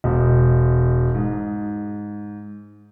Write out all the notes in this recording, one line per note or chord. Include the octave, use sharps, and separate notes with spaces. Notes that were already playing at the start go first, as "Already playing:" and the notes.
E1
G#2